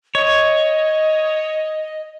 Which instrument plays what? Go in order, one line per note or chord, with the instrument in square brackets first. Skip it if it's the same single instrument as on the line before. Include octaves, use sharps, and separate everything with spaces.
[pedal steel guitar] C#5 [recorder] D#5